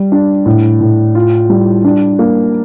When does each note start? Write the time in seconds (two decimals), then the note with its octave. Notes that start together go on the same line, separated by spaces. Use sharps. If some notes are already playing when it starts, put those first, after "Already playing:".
Already playing: G3
0.12 D4
0.46 A2
0.81 A2
1.15 F4
1.50 G3
1.85 D4
2.19 A#3